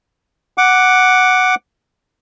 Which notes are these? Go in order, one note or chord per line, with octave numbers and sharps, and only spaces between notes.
F#5 D6